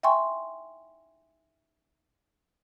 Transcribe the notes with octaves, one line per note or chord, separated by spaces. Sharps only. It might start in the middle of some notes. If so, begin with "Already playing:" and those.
E5 G5 G#5 C6 C#6